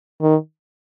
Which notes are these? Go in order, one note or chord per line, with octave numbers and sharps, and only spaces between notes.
D#3